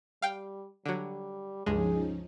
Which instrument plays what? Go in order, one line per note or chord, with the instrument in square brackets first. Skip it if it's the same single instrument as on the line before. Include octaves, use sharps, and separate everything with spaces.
[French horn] G3 [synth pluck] F5 G5
[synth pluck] D3 F#3 [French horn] G3
[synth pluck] C#2 G2 G#3 [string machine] F3 C#4 D#4 [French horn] G#4